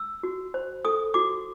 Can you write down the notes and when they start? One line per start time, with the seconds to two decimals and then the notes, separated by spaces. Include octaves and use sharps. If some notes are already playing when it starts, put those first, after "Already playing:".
Already playing: E6
0.23 F#4
0.54 C5
0.85 A4 D#6
1.14 F#4 D6